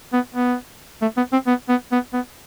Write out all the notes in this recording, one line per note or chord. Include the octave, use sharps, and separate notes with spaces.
B3
B3
A3
B3
C4
B3
B3
B3
B3